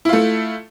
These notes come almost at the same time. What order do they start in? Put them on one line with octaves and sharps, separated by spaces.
E4 F4 A3